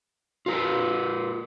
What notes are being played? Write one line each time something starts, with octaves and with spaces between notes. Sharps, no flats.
F4 A#4 B4